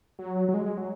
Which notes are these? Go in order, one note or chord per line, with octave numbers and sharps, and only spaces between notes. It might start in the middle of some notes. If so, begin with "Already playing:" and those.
F#3
F#3
G#3
G#3
F#3